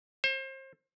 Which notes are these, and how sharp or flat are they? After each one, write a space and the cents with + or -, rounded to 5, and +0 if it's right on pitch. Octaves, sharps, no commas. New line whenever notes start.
C5 +35